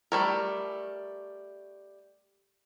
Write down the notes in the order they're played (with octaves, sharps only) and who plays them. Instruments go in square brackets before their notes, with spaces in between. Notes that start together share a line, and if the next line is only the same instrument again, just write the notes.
[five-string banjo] G3 A3 A#4